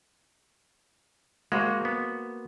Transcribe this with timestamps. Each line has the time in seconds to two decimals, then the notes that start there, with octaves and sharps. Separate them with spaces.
1.52 G#3 A#3 F#4 C5
1.85 B3